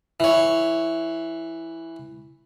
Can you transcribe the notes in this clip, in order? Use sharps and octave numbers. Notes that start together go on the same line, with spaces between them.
E3 C#5